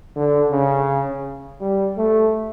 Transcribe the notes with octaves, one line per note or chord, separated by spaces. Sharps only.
D3
C#3
G3
A3